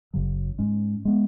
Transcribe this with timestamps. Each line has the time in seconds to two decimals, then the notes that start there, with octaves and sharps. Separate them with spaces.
0.14 F#1 F#2 C#3 F#3
0.58 G#2 G#3 C#4
1.05 G#3 B3